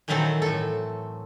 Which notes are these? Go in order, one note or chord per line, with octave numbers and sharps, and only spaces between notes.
A#2 D#3 E3 F#3 C4 A4
A2 A4